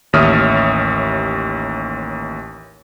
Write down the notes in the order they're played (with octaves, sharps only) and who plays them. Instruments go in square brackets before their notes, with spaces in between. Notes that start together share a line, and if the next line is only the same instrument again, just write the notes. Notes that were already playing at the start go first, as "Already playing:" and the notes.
[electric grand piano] A1 D#2 C#5 E5 D#6 F6